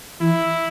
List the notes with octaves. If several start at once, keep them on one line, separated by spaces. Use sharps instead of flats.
E3 E4